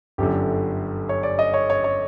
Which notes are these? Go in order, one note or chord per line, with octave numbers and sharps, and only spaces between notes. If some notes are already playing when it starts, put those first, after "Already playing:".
G1 F#2 D3 G4
C#5
D5
D#5
C#5
C#5
C#5